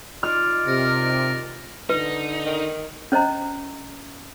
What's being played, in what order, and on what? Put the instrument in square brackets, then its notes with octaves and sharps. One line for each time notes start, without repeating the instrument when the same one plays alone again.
[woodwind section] D#4 F4 D5 [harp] F6
[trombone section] C3 [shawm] A#4
[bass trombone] D3 [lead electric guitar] D#4 [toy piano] B4
[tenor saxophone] D#3
[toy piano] C#4 C5 D#5 A#5